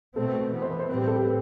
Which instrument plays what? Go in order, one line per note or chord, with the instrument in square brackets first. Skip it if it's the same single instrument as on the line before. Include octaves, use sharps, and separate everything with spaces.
[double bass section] B2 A3 C4 [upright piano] A4
[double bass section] E3 B3
[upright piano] C5
B4
C5
[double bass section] A2 G3 C4 [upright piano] B4
[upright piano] G4
A4
G4
B4